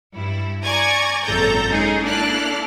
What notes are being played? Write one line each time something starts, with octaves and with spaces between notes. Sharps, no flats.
G2 E4
D5 G#5 A#5 C#6 D6 G#6
G#1 F#2 A#2 A4 A#5 G6
G#3 C#4 D#4 G#4
A#3 D4 E4 A4 F6 F#6